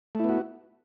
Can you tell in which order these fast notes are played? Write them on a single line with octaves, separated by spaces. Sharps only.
A3 E4 B3 F#4